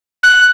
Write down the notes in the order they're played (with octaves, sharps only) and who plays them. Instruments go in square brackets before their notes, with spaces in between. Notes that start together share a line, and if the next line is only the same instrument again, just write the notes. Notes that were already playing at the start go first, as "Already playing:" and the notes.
[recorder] F#6